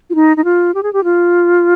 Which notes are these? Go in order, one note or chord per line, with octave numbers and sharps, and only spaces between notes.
F4
D#4
D#4
F4
G4
G#4
G4
F4